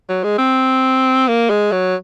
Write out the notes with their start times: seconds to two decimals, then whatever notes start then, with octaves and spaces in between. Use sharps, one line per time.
0.09 F#3
0.23 G#3
0.38 C4
1.28 A#3
1.50 G#3
1.72 F#3